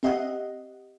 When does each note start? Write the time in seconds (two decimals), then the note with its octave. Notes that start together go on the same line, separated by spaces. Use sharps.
0.03 C4 G4 D#5 E5 F#5